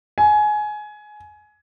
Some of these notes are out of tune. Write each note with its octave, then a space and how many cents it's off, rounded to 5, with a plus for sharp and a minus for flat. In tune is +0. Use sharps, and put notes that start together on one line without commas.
G#5 +20